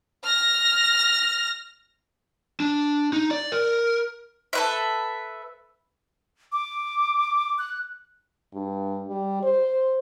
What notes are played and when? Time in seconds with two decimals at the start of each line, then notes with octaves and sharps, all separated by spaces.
0.25 F6 A#6
2.60 D4
3.13 D#4
3.31 D5
3.52 A#4
4.53 A4 B4 E5
6.52 D6
7.58 F#6
8.54 G2
9.08 G3
9.43 C5